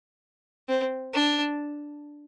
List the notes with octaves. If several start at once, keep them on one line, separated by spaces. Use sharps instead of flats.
C4
D4